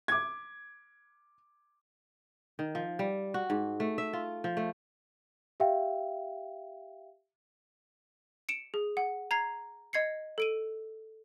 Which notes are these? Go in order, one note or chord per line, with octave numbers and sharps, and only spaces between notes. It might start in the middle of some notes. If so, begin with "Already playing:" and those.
D6 G#6
D#3
F3
G3
F#4
G#2
A3
E5
F4
F3
A3
G4 E5 F5 G5
C#7 D7 E7
G#4
F#5
A#5 G#6 C7 F7
D#5 G#6 C7 C#7
A4 D7 D#7